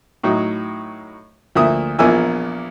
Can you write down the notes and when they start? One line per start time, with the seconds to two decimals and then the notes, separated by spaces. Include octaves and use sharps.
0.23 A2 F#3 D#4
1.55 D2 F3 A#3 E5 D#6
1.99 A#1 E2 F3 A#4 G#5 E6